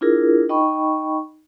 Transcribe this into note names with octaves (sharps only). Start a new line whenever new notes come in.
D4 E4 F4 G#4 A#4
D#4 D#5 G5 B5 C#6